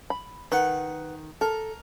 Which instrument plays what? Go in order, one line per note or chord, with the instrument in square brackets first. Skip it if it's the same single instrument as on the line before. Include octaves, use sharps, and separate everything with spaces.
[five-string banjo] B5
[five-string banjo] D#3 [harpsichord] B4 F#5
[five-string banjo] A4 [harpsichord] A#4